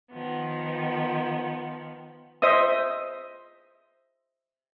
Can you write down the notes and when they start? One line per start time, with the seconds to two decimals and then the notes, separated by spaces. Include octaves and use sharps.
0.12 D#3 F3 B3
2.42 C5 D#5 E5 D#6